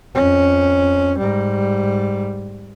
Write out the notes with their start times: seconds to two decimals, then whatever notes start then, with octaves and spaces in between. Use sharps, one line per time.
0.15 F2 C#4
1.18 G#2 G3